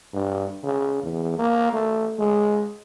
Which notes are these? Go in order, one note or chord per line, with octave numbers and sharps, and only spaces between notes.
G2
C#3
E2
A#3
A3
G#3